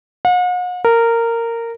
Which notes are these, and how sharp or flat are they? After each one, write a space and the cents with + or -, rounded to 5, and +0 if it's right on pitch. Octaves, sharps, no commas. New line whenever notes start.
F#5 -45
A#4 -15